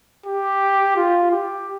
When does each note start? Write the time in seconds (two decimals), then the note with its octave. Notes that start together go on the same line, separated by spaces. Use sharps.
0.26 G4
0.97 F4
1.32 G4